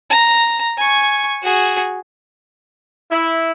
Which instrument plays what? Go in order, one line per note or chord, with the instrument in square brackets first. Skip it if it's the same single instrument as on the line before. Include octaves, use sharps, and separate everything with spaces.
[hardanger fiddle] A#5
G#5 C#6
F#4 G#4
[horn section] E4